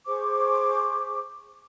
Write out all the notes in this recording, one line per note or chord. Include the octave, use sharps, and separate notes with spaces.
G#4 C5 C#6 D6